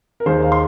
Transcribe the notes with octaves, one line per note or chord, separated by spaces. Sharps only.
A#4
D#2 D#3 G#3 C5
F5
C6